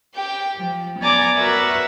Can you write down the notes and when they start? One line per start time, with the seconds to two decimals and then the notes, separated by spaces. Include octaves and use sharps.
0.14 G4 G5
0.57 F3
1.00 B3 D5 G#5 A#5 D6 G#6
1.36 F#4 A#4 B4 E5 B5